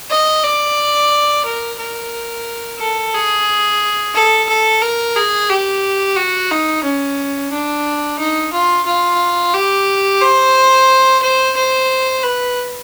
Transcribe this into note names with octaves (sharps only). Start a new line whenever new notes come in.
D#5
D5
A#4
A#4
A4
G#4
A4
A4
A#4
G#4
G4
F#4
D#4
C#4
D4
D#4
F4
F4
G4
C5
C5
C5
B4